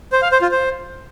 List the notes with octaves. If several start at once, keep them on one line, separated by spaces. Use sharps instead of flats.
C5
F5
C5
F4
C5